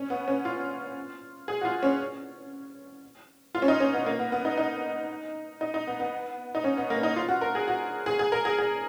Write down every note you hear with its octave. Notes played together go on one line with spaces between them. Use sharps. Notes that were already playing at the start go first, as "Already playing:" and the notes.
Already playing: C#4
B3
C#4
F4
G#4
F#4
F4
C#4
F4
C#4
D#4
C#4
B3
A#3
B3
B3
D#4
D#4
D#4
D#4
B3
B3
D#4
C#4
B3
A#3
D#4
F4
F#4
A#4
G#4
F#4
G#4
G#4
A#4
G#4
G#4